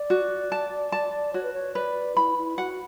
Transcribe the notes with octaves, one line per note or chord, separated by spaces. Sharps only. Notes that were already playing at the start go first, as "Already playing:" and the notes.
Already playing: D5
F#4
A5
A5
F#4 C#5
B4
C#5
B4 D5
E4 B5
E4
F#4 F#5